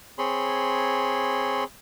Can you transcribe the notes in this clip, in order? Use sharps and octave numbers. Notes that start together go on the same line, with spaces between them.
C4 G#4 C#5 B5 C6